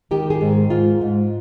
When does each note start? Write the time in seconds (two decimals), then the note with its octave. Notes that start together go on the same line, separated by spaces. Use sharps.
0.11 D#3 G4
0.30 G#4
0.41 G#2
0.70 G#2 F4
1.01 G#2